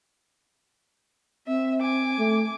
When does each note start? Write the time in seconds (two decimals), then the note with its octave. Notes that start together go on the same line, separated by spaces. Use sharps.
1.47 C4 E5
1.81 G#5 D6
2.19 A3